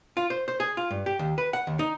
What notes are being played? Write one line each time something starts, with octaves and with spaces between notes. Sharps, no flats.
F4
C5
C5
G#4
F4
G2
G4
D#2
B4
F#5
D#2
D#4